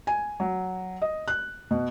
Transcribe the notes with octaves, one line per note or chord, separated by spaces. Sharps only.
G#5
F#3
D#5
F#6
B2